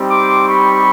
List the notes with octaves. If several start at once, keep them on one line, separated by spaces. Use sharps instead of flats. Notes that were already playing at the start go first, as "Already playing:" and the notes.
Already playing: G3 C4 D#4 G4
C6 D6
B5 C#6